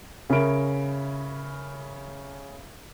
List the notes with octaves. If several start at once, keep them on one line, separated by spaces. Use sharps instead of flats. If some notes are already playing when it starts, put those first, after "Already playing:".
C#3 C#4 A#4 E5 B5 D7